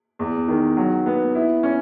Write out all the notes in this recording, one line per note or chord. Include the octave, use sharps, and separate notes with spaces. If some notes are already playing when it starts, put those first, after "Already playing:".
E2
D#3
F#3
B3
E4
C#4